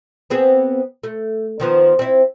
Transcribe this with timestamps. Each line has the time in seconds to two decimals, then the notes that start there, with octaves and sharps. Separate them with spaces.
0.30 B3 C4 G#4
1.04 A3
1.60 D#3 F3 B3
1.99 C4 E4